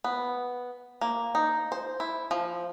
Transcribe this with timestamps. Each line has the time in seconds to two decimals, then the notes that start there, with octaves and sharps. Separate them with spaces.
0.04 B3
1.01 A#3
1.35 D#4
1.72 C5
2.00 E4
2.31 F3